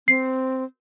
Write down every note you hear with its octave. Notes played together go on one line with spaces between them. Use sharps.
C4 C7